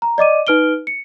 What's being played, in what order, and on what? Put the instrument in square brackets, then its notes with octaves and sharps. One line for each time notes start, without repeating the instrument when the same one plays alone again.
[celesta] A#5
D5 D#5 D6 D#7
D#4 B4 F6 D7 G7
C#7